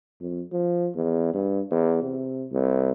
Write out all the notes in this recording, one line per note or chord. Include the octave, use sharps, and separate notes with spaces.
F2
F3
E2
G2
E2
C3
C2